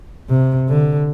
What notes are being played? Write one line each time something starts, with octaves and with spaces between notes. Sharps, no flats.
C3
D3